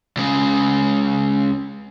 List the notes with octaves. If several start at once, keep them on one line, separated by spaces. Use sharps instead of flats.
C#2 C#3